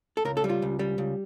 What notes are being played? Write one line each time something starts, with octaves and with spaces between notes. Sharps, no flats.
A4
C#2 A#4
A4
G3
F4
C#2
G3
C#2